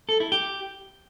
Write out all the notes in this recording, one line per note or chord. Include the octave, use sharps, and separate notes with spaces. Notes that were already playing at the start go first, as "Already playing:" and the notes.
A4
E4
G4